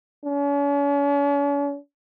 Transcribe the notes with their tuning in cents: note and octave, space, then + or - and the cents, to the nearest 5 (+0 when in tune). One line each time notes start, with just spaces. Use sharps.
C#4 +45